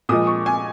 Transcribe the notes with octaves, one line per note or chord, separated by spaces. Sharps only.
A#2 F3 G#3 D#6
C#6
G#5